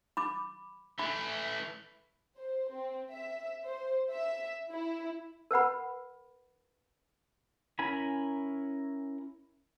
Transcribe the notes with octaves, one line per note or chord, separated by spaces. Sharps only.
B5 D6
E3 A3 B5
C5
C4
E5
C5
E5
E4
A#4 B4 F#5 B5
C#4 E4 A#4 G#5 B5